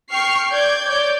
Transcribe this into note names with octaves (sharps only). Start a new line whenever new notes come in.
G5 C#6 F6 C7
D5 G6 G#6
C#5 D5 G6